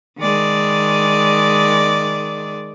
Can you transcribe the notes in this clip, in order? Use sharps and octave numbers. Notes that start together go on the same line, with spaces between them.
D#3 G#3 D5